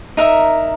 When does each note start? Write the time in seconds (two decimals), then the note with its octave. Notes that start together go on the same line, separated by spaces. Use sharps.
0.17 D#4 A#4 E5